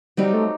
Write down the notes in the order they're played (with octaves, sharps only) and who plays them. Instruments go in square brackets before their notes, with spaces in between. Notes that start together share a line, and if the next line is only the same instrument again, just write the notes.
[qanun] F#3 C4 D#4 G4 [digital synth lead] G3
[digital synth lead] A3